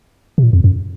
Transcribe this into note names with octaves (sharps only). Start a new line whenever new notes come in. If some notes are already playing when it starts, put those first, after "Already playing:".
C3
A#2
F2
F#2